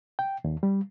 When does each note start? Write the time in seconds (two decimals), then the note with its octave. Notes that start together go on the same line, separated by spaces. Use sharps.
0.19 G5
0.44 D#2
0.63 G3